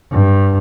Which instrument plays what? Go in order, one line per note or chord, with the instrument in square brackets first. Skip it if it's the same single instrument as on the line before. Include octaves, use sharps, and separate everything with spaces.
[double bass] G2